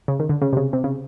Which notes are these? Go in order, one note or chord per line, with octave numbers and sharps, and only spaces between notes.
C#3
D#3
D3
C#3
C3
C#3
C3
C#3